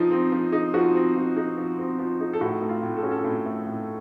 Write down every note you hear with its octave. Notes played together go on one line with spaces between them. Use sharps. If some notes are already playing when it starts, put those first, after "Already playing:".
Already playing: F3 C4 D#4
C4
F3
D#4
F3 F#4
C4
F3
D#4
F3
C4
F3
D#4
A4
A2 F#4
A3
F4
A2
A4
C#4 F#4
A4
A2
A3
A2